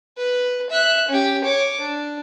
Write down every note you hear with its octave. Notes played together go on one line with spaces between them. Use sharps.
B4
E5 F#6
C#4 G4
C#5 D6
D4